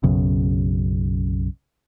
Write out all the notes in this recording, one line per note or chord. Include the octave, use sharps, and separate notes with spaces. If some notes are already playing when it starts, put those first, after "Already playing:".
B1 F#2 C#3